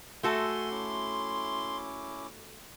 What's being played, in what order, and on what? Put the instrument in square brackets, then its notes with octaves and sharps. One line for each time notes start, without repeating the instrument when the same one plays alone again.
[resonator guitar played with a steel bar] A3 F#4 A4 [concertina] E5 G#5 [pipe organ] C6
[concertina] C#4 E4 D6